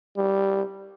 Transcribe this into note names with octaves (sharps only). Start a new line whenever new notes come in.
G3